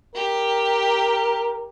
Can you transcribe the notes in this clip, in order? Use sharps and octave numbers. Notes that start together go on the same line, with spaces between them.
G4 A#4